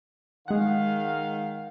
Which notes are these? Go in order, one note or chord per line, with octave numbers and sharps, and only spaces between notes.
D#3 G#3 F5 F#5